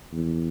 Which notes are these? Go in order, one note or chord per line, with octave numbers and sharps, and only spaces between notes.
E2